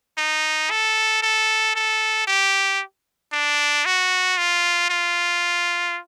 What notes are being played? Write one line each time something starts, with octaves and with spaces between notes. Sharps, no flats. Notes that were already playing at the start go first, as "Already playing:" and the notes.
D#4
A4
A4
A4
G4
D4
F#4
F4
F4